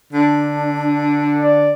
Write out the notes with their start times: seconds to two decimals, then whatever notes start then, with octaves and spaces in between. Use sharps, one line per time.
0.13 D3 D4
1.41 D5